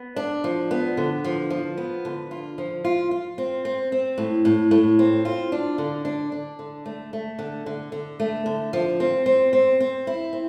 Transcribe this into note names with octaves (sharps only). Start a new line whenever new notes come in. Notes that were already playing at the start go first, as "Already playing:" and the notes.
Already playing: B3
D4
F3
B3
D3
F3
F3
B3
D3
F4
F3
F4
F4
C4
C4
C4
A2
A2
A2
C4
F4
D4
D3
D4
D4
D3
A3
A3
D3
D3
D3
A3
D3
F3
C4
C4
C4
C4
E4
C4